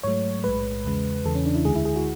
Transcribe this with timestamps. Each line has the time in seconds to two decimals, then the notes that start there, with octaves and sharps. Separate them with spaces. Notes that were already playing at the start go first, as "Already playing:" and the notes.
0.03 G#2 F#3 A3 C#5
0.44 B1 A2 G#3 B4
0.85 E2 C#3 G#3
1.24 E2 C#3 E3 A4
1.35 C#4
1.46 D4
1.55 E4
1.65 D2 D3 G#3 G#4
1.75 E4
1.85 G#4
1.96 F#4